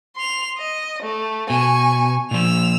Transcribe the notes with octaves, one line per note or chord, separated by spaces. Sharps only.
C6 F7
D#5
A3
B2 G#5 C#6
A#2 F3 E6 F7